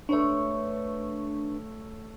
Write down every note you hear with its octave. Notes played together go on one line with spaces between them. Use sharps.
A3 D4 B4 C#5 C#6